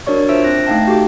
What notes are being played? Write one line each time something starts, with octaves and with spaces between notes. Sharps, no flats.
D4 F#4 A#4 C#5 D5 C#6
D4 F4 C5 E5 E6 D7
C4 F#6 A#6
A3 D#4 F5 G5 A5
F#4 G4 A4 D6